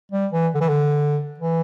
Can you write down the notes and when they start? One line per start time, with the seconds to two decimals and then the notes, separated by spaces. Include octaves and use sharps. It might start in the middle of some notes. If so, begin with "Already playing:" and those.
0.12 G3
0.32 E3
0.54 D3
0.61 E3
0.69 D3
1.39 E3